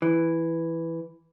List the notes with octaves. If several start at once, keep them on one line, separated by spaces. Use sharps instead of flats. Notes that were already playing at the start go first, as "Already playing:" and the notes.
E3